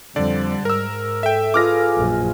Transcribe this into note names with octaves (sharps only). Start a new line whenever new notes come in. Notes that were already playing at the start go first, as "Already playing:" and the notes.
F2 D3 G3 D5
G#2 A#4 E6
A4 E5 G5
F4 G#4 B4 D6 F6 A#6
A#1 F#2